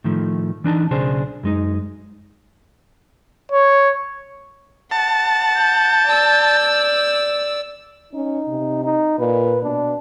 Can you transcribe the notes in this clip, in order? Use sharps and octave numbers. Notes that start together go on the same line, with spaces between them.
A2 D#3 F3 A3
E3 D4 D#4 A5
B1 C#3 D4 G#4 C5
F#2 G#3 D#4
C#5
F#5 A5
G6
D5 E6
C#4 D#4
C3
D#4
A#2 B4
B2 D4